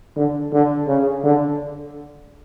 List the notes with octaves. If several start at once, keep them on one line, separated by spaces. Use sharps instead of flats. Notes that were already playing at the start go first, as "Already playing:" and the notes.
D3
D3
C#3
D3